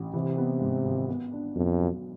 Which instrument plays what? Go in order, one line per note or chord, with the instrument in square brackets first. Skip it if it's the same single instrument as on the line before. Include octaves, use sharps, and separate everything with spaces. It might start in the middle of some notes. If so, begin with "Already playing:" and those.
Already playing: [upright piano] A1
[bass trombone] C3 [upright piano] E3
[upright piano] B3
G#2
G#1
B3
D4
[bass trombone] F2 [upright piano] B2
[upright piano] B1